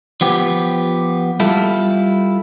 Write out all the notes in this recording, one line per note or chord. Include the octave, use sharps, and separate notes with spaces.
F3 B3 G4
G3 E4 F4 A4